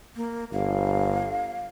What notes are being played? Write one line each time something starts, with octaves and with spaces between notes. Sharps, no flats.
A#3
G1 F5